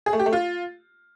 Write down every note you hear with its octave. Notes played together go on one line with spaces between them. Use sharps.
G#4
A3
G4
A3
F4